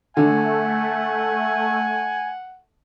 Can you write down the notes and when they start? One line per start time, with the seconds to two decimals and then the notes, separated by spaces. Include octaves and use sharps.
0.17 D3 A3 F#5 G#5